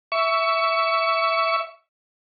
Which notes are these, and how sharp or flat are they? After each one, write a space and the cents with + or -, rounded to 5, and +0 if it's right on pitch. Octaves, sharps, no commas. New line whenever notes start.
E5 +0 C#6 +20